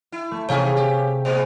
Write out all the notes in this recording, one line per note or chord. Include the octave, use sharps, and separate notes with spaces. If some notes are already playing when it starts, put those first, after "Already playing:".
E4
A3
C3 D#3 C#4 G#4 C#5 F5 G#5
G4
A2 G#3 B3 C5